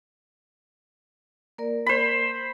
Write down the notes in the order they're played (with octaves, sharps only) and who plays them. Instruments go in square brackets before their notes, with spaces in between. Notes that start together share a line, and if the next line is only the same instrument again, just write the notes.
[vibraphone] A#3 A#4 D5
[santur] C5 B5